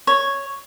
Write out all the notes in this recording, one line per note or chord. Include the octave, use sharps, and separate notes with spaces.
C#5